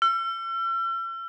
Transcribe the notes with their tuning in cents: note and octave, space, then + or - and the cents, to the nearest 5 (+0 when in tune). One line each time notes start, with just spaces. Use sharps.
E6 +45